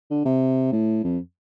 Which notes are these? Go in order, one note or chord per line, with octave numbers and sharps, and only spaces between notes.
D3
C3
A2
F2